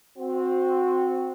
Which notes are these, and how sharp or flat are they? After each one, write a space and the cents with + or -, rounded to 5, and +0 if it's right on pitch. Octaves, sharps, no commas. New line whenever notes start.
C4 +0 F#4 -20